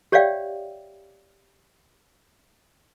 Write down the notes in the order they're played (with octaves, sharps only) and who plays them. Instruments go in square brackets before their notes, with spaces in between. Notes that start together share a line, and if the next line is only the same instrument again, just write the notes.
[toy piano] G4 C#5 D5 E5 F5 G5